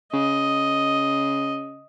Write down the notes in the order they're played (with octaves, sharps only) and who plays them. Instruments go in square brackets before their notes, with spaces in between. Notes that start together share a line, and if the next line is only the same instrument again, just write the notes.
[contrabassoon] C#3 [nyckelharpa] D#5